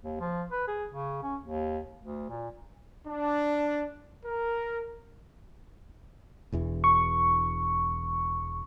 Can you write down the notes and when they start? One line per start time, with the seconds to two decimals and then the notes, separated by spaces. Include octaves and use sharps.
0.03 D#2
0.20 F3
0.51 B4
0.68 G#4
0.91 C#3
1.23 C#4
1.40 D#2
2.01 D2
2.30 A#2
3.07 D4
4.25 A#4
6.52 E1 E2 E3
6.84 C#6